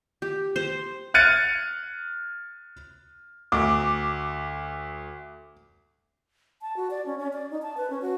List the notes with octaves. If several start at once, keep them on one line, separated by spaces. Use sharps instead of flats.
G4
C5
F6 F#6 G#6 A6 C#7 D#7
D2 D6
A5
F#4
D5
C#4
C#4
D5
D#4
A5
B4
C#4
F#4